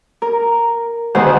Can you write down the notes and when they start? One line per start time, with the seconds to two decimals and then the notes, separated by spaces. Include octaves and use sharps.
0.22 A#4
1.15 D2 B2 D#3 G#3 C5 F#5